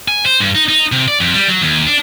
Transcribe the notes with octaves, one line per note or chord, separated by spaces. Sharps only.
G#5
C5
G2
D#4
D#4
C3
D5
F2
G3
F#3
D#2
D4